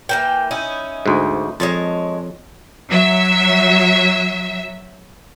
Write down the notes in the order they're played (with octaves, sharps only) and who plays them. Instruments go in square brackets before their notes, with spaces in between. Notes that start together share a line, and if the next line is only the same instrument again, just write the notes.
[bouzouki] E3 A#3 G5
C#4 D#4 E4
[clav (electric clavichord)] D2 G#2
[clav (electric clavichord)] F2 [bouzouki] G#3 C#5 A5
[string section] F#3 E5